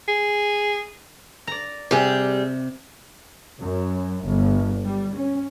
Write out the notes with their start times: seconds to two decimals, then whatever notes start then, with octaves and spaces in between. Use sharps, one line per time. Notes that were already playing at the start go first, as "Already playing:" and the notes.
0.08 G#4
1.47 D5 A#5
1.91 C3 G3 G4 G#4
3.59 F#2
4.26 G1
4.84 G3
5.15 C#4